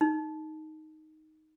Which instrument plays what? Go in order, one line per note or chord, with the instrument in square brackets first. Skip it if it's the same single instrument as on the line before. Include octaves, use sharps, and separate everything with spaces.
[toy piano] D#4